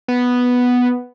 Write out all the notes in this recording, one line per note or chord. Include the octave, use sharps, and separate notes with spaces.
B3